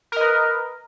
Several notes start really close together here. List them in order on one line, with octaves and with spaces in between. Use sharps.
A#4 D#5 B4